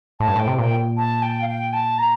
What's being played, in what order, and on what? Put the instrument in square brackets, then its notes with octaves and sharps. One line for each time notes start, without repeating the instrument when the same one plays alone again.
[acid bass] A2 [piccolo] A5
[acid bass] G2
[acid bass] A2 [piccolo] G5
[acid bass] C3
[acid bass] A#2 [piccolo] G5
[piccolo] A5
G5
F5
G5
A5
A#5